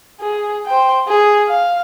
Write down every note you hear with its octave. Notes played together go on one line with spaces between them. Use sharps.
G#4
C5 G5
G#4
F5